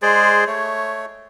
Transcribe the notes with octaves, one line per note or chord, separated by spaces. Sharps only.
G#3 G#4 C5 D5
A3 C#5